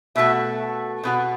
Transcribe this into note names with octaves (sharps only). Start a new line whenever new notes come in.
B2 A3 F#4 E5
B2 B3 F#4